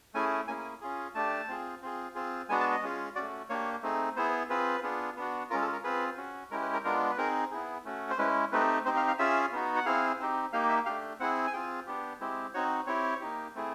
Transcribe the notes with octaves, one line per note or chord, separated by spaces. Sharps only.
A3 C#4 E4 G#4 G#5
A#3 C#4 E4 G#4 G#5
C#4 F4 G#4
A3 D4 G4 A5
C4 F4 G#4
C4 F4 G#4
C4 F4 G#4
G#3 B3 D4 F#4 G#5
A5
D#5
G#3 C#4 F4 G#4
A3 C#4 F#4 D5
A#3 D4 G4 C#5
A3 C4 D#4 G#4
B3 E4 G#4 C5
C4 F4 G#4 B4
B3 D4 F4 G#4
B3 D4 F#4
G#3 C#4 F4 A#4
A4
A#4
C4 F4 G#4 B4
C#4 F#4
G#3 C#4 E4 G4 A#4
B4
A#4
G#3 B3 D4 F4 A#4
B4
C4 D#4 G#4 A#4
B3 E4 G#4
A3 C#4 F#4
C5
G#3 C#4 E4 B4
A3 C4 D#4 G4 B4
C4 D#4 G4 C5
F5
F5
C#4 F4 G#4 E5
B3 D#4 F#4
F#5
C4 E4 G#4 F5
C4 D#4 G4
A#3 D#4 G4 F5
E5
A3 D4 G4 F5
C4 E4 G#4 F#5
G#5
C4 F4 G#4 G5
B3 D4 G4
G#3 C4 E4 G4
C4 D#4 F#4 C#5
C4 E4 G4 C#5
A#3 D#4 G4
A3 C4 E4 G#4